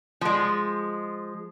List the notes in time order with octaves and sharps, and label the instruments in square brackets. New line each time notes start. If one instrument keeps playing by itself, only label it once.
[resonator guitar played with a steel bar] F3 G#3